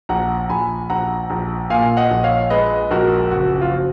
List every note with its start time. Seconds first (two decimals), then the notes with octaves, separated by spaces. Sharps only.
0.09 A#1 F#5 A#5
0.50 A#1 G#5 B5
0.90 A#1 F#5 A#5
1.30 A#1
1.70 A#2 F5 G#5
1.97 D#5 F#5
2.11 A#1
2.24 C#5 F5
2.50 G#3 B4 D#5
2.91 A#1 F#4 A#4
3.31 F#1 F#4
3.61 F4
3.71 F3 F#4